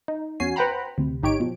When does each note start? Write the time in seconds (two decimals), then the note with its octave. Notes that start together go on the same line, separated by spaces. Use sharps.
0.08 D#4
0.40 E2 C#4 F#4 G#5 C7
0.56 B4 C5 F#5 G5 A#5 B5
0.98 D2 C3
1.23 G1 D#4 G4 C#5 D7
1.40 B2 F3